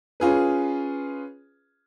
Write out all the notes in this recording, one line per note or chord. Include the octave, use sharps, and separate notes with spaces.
C#4 F4 G#4 B4